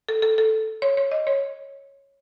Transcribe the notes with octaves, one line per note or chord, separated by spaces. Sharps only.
A4
A4
A4
C#5
C#5
D#5
C#5